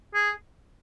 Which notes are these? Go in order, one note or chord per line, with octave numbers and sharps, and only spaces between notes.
G#4